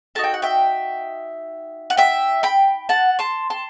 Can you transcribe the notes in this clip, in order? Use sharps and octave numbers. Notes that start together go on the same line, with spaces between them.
D#4 F#4 A4 A5
G5
F#5
E5 G5
F#5
E5 G5
G5 B5
F#5 A5
A5 C6
A5 C6